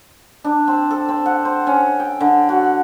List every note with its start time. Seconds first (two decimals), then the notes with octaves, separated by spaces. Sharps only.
0.44 D4
0.68 C4
0.91 A4
1.09 C4
1.26 F#5
1.45 C5
1.67 C#4
2.00 G5
2.21 D3
2.49 F#4